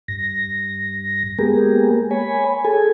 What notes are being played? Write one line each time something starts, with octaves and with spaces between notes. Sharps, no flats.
G2 A#6
G#3 A#3 B3 G4 G#4 A#4
C#5 G#5 B5
G#4 A4 G#5